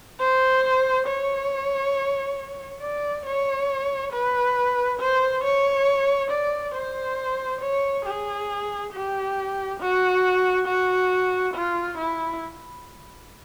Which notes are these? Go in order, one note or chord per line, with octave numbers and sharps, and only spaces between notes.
C5
C#5
D5
C#5
B4
C5
C#5
D5
C5
C#5
G#4
G4
F#4
F#4
F4
E4